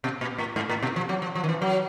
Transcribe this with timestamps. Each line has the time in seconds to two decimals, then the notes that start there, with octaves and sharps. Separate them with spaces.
0.04 B2
0.21 A#2
0.38 A2
0.56 G#2
0.69 A2
0.83 B2
0.96 F3
1.09 F#3
1.22 F3
1.35 F3
1.44 D#3
1.49 E3
1.62 F#3